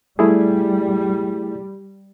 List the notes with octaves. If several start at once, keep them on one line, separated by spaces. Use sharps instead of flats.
G3 A3 E4 G#4